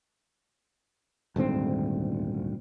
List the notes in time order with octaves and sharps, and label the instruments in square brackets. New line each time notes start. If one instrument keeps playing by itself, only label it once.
[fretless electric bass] D#1 D2 G#2 C4